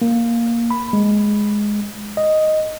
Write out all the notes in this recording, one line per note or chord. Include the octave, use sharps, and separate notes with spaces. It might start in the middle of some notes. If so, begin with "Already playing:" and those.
A#3
B5
G#3
D#5